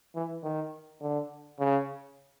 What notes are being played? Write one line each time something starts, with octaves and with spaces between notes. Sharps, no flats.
E3
D#3
D3
C#3